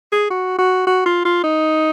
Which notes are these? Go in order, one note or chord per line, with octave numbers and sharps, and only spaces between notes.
G#4
F#4
F#4
F#4
F4
F4
D#4